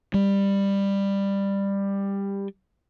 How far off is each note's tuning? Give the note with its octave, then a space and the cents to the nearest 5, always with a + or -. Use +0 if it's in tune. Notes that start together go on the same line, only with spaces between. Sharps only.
G3 +15